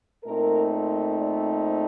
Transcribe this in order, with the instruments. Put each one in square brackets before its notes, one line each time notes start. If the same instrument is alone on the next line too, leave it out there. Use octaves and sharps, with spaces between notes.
[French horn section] A#2 A3 C4 D#4 A#4
A#4
D5
C5